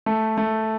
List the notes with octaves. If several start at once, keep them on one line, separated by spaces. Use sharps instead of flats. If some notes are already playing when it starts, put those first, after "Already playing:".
A3
A3